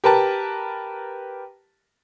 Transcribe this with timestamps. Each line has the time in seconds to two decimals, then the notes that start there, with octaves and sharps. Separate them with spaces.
0.04 G4 A#4 B4 A5